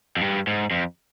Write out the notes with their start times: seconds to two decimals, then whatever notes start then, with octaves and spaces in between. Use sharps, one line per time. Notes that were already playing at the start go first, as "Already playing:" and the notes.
0.17 F2
0.21 G2
0.47 G#2
0.71 F2